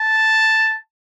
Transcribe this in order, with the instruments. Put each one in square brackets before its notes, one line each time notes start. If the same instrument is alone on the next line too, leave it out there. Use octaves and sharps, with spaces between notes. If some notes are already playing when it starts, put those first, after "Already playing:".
Already playing: [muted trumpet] A5